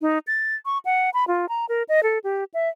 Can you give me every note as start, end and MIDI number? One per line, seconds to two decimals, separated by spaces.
0.02 0.19 63
0.27 0.55 93
0.65 0.78 85
0.85 1.10 78
1.14 1.25 83
1.28 1.48 65
1.49 1.65 82
1.69 1.83 70
1.89 2.03 75
2.03 2.18 69
2.24 2.44 67
2.54 2.69 76